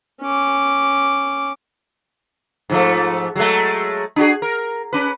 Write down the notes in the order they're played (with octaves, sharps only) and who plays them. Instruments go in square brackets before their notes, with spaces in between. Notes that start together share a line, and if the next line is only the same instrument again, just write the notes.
[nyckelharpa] C#4 D6
[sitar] G#2 F3 A3
F#3 G#3 A3
D4 F#4 G#4
A#4
C#4 B4